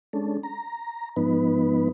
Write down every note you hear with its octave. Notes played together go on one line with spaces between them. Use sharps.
G#3 C#4 D4 A4
A#5
G#2 F3 B3 D#4 B4